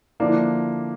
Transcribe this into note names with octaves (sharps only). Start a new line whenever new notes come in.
D3 F3 A#3 D4 E4